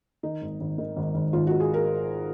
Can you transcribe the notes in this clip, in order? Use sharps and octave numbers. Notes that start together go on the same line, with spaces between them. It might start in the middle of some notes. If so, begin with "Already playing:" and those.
D#3 D#4
G#1
G#1
D#3
G#1
G#1
G#1 F4
D#3 F#4
G#4
A#4